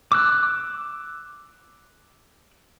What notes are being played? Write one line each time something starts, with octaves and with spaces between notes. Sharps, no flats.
D6 E6 F#6